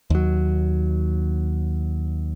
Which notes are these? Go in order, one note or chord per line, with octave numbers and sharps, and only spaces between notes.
D#2 F#3